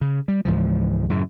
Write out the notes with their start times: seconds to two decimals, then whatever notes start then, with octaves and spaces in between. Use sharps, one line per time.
0.01 C#3
0.28 G3
0.45 C#2 G#2 E3 F3
1.10 F#2 A2 C#3